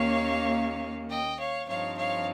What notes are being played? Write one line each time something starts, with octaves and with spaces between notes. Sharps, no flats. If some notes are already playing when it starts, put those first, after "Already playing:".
Already playing: D#2 D#3 A#3 C#4 C#5 F5
D#5 G5
C#5 F5
G2 F3 C4 D#4 C#5 F5
C#5 F5